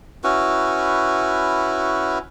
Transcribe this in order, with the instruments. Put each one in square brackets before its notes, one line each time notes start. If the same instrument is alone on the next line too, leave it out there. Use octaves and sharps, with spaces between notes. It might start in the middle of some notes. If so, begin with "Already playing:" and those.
[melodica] C#4 E4 F#4 B4